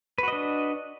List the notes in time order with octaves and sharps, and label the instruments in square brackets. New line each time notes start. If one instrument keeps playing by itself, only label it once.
[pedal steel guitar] B4
F#4
D#5
D4